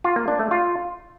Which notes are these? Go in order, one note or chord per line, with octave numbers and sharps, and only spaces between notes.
F4
A#3
D4
A3
F4